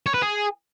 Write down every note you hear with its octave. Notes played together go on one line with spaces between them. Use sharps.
C#5
B4
G#4